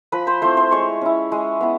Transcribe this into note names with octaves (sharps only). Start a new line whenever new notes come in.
F3 B4 B5
C5 C6
A3 C4 E4 C5 C6
C5 C6
G#3 C#5 C#6
C#4 E4
G#3
B3 E4